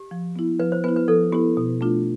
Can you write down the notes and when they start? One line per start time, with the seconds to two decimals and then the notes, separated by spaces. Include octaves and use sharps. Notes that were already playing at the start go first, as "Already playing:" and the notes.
Already playing: G4
0.11 F3
0.36 B3 E4
0.60 F3 B4
0.72 C5
0.84 B3 B4
0.88 E4
0.96 B4
1.08 F3 A4
1.32 B3 E4 G4
1.57 B2
1.81 A3 D4 F4